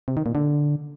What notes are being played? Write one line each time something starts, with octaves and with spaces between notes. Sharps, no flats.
C3
D#3
A#2
D3